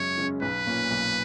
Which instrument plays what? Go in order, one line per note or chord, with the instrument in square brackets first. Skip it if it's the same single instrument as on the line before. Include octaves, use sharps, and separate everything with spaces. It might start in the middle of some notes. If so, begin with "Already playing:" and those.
Already playing: [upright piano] F#2 C#3 G#3 C#4 [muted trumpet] C#5
[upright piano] C#3 G#3 C#4
[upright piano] B1 [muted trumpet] B4
[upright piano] A#2 A#3 C#4
B1